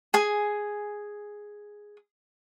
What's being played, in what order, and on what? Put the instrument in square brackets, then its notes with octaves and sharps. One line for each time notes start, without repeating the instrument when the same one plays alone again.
[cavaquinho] G#4 G#5